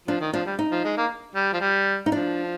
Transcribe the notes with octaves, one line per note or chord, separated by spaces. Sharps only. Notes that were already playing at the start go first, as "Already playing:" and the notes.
F3 D4
D#3
F3 D4
G3
D#4
F3
G#3
A#3
G3
F3
G3
D#4
F3 D4